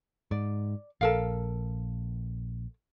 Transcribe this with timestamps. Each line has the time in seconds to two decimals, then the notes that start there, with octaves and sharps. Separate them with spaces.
0.31 G#2 D5
1.01 A#1 A4 A#4 F5